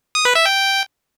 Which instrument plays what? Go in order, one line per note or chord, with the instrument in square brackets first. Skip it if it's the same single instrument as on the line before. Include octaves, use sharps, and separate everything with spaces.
[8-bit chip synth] D#6
B4
E5
G5